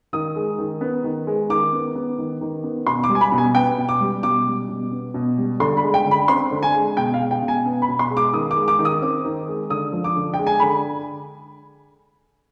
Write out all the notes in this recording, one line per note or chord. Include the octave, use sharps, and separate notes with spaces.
D#3 D#6
G#3
D#3
B3
D#3
G#3
D#3 D6
B3
B3
D#3
D#3
B3
B2 C6
D6
G3
G#5
B5
B2
G#5
B3 G5
B2
D6
G3
B2 D6
G3
B2
B3
B2
G3
D3 C6
B5
G#3
G5
D3
B5
C4 C6
D3
G#5
G#3
B2 G5
F5
G#3
G5
B2
G#5
B3
B5
B2
C6
G#3
D6
D#3 D#6
D6
G#3
D6
D#3
D#6
C4 D6
D#3
G#3
D3 D#6
F3
D6
D3
G5
G#3
G#5
D3 B5